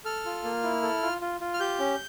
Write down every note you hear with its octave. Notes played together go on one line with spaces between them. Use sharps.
A4 F6
F4
A#3
E4
A4
F4
F4
F4
F6
G4 G6
C#4